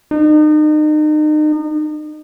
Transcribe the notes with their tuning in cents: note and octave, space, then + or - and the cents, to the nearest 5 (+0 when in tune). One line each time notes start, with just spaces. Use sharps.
D#4 -35